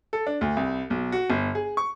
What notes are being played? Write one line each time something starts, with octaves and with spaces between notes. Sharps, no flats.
A4
D4
D2
C2
B1
F#4
G1
G#4
C#6